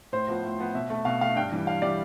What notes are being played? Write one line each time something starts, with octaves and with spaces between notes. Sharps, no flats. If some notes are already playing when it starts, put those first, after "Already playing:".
A2 C5
F3 B3
A2
F3 B3
B2 E5
A3
B2 F5
A3 F5
G2 G5
E3 G3
G2 F5
E3 G3 D5